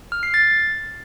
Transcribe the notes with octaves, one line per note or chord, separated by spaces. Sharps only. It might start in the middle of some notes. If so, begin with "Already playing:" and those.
F6
C7
A6